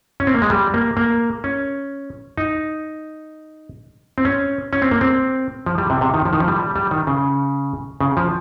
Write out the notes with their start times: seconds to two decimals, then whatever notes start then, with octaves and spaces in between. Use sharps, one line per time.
0.20 C#4
0.27 C4
0.34 A#3
0.42 G#3
0.50 G3
0.74 A#3
0.97 A#3
1.44 C#4
2.38 D#4
4.18 C4
4.25 C#4
4.73 C#4
4.82 C4
4.91 A#3
5.01 C4
5.66 F3
5.78 G3
5.90 C3
6.01 C3
6.14 D#3
6.25 F3
6.33 D#3
6.40 F3
6.48 G3
6.60 G3
6.76 G3
6.91 D#3
7.07 C#3
8.01 C#3
8.17 F3